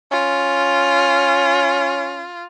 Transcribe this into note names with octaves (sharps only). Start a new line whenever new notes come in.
C#4 F4